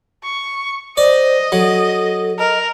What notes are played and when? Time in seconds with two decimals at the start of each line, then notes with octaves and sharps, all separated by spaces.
0.24 C#6
0.97 C5 D5 D#5
1.52 F#3 A4
2.38 A#4 D#5